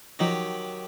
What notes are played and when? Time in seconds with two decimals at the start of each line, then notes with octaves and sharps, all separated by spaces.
0.19 D#3 F3 F#3 D#4 G4 A#6